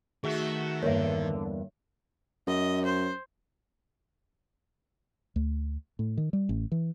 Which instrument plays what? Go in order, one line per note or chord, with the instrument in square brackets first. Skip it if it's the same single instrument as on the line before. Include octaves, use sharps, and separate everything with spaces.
[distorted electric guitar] D#3 [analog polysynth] A3 F#4 E5 [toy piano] G#4
[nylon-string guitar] E2 G2 A#3 [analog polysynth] D3 [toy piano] C#5 E5
[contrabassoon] F#2 [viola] D#5
[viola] C5
[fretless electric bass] D2
A2
D#3
G3
A1
E3